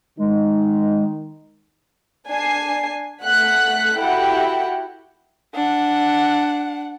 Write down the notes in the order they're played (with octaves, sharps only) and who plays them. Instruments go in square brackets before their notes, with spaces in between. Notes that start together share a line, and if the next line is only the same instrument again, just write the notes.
[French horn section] D#3 D#4 [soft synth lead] G#3
[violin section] D4 G#5 C7
A3 F#5 F#6 B6
E4 F#4 G4 A4 F#5 G5
[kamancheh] D4 F#5